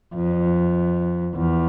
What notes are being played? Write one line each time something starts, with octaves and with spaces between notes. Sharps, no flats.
F2
E2